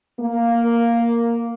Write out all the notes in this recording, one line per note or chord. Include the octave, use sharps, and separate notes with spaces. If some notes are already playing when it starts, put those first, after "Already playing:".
A#3